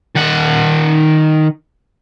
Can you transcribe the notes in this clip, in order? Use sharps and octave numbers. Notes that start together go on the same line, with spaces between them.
D#3 F#5